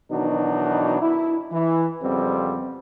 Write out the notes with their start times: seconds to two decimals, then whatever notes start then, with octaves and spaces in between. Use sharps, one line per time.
0.10 B2 D#3 E3 F#3 D4 D#4
1.00 E4
1.52 E3
2.02 F2 C#3 G3 B3 C4